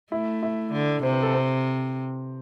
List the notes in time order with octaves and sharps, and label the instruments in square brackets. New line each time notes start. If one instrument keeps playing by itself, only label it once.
[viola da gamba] A3 [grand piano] E4
[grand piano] E4
[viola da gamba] D3
[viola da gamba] C3 [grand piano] C5
[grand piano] B4
A4
C4